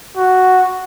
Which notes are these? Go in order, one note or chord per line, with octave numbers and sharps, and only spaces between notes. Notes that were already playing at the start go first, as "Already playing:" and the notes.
F#4